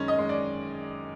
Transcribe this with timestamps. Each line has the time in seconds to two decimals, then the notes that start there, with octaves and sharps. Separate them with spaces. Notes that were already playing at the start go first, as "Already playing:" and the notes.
Already playing: F#2 D#3 G#3 C#4
0.08 D#5
0.19 G#3
0.29 D5